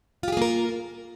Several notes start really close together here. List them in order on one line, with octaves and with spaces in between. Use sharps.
F4 G4 G#4 A#3 A#4